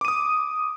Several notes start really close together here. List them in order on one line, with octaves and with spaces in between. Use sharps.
D6 D#7 D#6